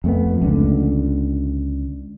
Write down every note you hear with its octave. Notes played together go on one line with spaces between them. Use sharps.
F2 A3 B3
C#2 D3